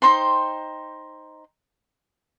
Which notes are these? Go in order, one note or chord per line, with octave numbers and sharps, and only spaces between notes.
D#4 C5 G5 C6